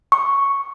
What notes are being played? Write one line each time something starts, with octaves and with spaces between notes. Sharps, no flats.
C#6